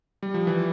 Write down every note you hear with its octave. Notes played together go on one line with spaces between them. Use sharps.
G3
F3
E3